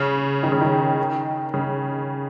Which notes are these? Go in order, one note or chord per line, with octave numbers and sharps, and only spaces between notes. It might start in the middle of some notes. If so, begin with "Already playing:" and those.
Already playing: C#3
D#3
C#3
D#3
C#3